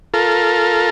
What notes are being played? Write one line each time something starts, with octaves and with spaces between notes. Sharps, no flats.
F4 A4 A#4